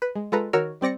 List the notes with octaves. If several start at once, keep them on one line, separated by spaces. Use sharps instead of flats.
B4
G#3
G#3 F4 A4 B4 A#5
D#3 F#4 A#4 C#5 E6 F6
G3 C4 D5 A#6 C#7